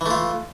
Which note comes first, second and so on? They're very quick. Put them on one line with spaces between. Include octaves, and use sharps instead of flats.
E3 A3 F4